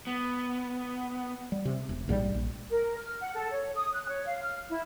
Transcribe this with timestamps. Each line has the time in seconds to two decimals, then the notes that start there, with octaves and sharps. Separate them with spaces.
0.07 B3
1.52 G3
1.65 C3
1.89 E1
2.08 A#1 G#2 D3 G3
2.34 A#1
2.70 A#4
2.97 F6
3.20 F#5
3.34 A4
3.51 C#5
3.75 D#6
3.94 F#6
4.08 C#5
4.24 F5
4.41 F6
4.69 E4